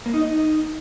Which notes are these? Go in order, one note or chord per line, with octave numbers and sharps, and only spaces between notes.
A#3
D#4
D#5
D#4